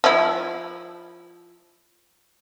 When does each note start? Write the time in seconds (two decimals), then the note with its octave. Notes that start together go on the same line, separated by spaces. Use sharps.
0.04 F3 E4